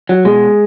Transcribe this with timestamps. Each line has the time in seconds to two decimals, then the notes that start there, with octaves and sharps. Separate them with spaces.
0.09 F#3
0.25 B2 G#3